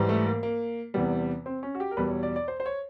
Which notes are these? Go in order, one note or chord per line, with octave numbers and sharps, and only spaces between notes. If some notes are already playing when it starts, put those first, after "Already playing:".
Already playing: G#2 E3 G3
A3
A#3
A#3
E2 C3 E3 G3 B3
C4
C#4
F#4
G4
A#4
E2 B2 G3 B4
C#5
D5
D5
C5
C5
C#5